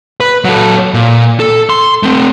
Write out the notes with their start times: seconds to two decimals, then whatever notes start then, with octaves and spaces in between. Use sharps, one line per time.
0.20 B4
0.45 F#3 A4
0.94 A#2
1.40 A4
1.70 C6
2.03 A3 C4